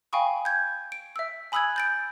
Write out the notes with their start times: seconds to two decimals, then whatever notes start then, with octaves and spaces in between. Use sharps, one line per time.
0.13 F5 G5 G#5 B5 C#6 D#6
0.45 G6 G#6
0.92 D7
1.16 E5 E6
1.52 G#5 B5 D#6 E6 F#6 G#6
1.76 G6 A6 D7